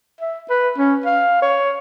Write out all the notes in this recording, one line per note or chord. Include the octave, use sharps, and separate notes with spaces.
E5
B4
C#4
F5
C#5